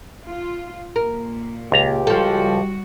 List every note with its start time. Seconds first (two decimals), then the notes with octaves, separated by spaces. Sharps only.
0.25 F4
0.96 A#2 A#4
1.72 C#2 G4 A#5
2.07 F3 G3 F#4 A4